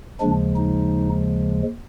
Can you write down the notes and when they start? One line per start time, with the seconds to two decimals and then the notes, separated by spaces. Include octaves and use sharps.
0.20 D#2 C#3 F3 G#3 D4
0.56 D#4